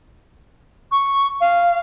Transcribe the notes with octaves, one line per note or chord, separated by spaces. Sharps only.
C#6
F5